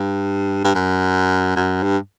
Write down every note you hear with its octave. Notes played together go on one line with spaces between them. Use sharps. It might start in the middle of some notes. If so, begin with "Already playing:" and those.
Already playing: G2
G2
F#2
F#2
G2